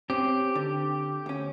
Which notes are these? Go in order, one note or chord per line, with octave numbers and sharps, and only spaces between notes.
C4 C#4 G4
D3
D2 C#4